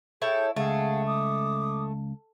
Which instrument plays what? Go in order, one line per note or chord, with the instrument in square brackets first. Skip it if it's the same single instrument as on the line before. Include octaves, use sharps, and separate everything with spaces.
[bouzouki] E4 A4 C#5 [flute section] G#4 G5 G6
[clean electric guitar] C#2 [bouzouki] A3 [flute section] G#4 F5 F#5
[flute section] D6 D#6